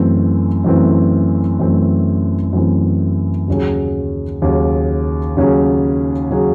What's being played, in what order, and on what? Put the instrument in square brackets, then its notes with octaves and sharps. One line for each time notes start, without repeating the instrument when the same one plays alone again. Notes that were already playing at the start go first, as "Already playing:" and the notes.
Already playing: [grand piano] F#2 E3 A3 C4
F#2 E3 A3 C4
F#2 E3 A3 C4
F#2 E3 A3 C4
D#2 C#3 F#3 C#4 G#4
D#2 C#3 F#3 C#4 G#4
D#2 C#3 F#3 C#4 G#4
C#3 F#3 C#4 G#4